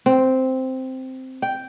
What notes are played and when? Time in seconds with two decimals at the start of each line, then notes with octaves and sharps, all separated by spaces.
0.06 C4
1.42 G5